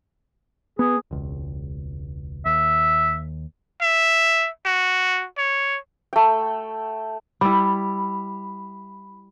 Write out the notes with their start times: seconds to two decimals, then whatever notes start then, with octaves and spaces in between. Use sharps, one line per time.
0.79 B3 G#4
1.11 E1 C#2
2.45 D#2 E5
3.82 E5
4.65 F#4
5.38 C#5
6.13 A3 G5
7.41 G3 E4 B5